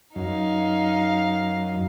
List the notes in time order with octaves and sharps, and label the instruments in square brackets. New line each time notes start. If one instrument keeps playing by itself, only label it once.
[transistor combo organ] F#2 [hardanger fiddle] D#4 F5